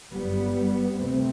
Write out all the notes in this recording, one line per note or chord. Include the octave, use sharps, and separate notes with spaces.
G1 F#2 G3 B3
D2 C3 A3 C4